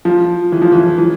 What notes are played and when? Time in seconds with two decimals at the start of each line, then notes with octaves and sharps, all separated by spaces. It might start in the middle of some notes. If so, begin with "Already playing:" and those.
0.05 F3
0.52 E3
0.62 F3
0.72 E3
0.98 E3